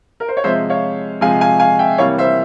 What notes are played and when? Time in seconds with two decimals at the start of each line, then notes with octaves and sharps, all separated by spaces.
0.20 A#4
0.28 C5
0.37 C#5
0.44 C3 F3 G#3 C5 E5
0.70 C#5 F5
1.21 C3 F3 G#3 F5 G#5
1.41 F5 G#5
1.59 F5 G#5
1.79 E5 G5
1.98 C3 E3 G3 A#3 C#5 F5
2.18 C5 E5